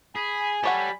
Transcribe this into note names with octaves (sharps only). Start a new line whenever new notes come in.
G#4 G#5 B5
G3 G4 A4 C#5 F#5 B5